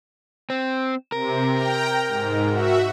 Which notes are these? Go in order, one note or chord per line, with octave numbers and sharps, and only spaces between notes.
C4
C3 A#4
G5 A#5
G#2
F#4 E5